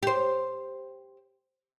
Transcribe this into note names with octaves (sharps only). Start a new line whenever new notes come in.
G4 C5